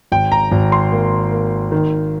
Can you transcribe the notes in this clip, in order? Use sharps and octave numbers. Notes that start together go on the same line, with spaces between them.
G#1 G5
A#5
G#1
C6
A#3
A#3
D#3